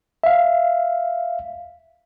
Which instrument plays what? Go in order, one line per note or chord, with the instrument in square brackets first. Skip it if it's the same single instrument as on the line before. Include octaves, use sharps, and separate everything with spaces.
[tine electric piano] E5 F5